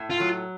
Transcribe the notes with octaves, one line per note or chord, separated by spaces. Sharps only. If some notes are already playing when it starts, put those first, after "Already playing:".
Already playing: A2
F4
F#3